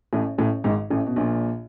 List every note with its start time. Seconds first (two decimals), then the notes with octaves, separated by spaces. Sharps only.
0.13 A1 A2
0.38 A1 A2
0.64 G#1 G#2
0.90 A1 A2
1.07 B2
1.16 A#1 A#2